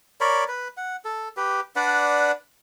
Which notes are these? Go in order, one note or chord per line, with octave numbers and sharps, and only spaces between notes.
A#4 C#5 D5 B5
B4
F#5
A4
G4 B4
D4 B4 D5 F#5